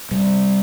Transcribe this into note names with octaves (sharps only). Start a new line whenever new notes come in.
C3 G3